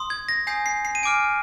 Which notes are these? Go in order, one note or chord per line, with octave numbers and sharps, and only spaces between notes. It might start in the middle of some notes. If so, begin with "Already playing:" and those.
Already playing: C6 D#6
G#6
A#6
G#5 D#6 G6 C7
C7
C7
D#7
G#5 D6 F6 D7